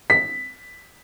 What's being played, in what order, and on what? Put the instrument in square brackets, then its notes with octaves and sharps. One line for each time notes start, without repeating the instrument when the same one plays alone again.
[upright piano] B6